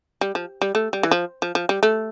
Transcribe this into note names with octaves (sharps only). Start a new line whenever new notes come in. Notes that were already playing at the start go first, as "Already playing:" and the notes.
G3
F3
G3
A3
G3
E3
F3
F3
F3
G3
A3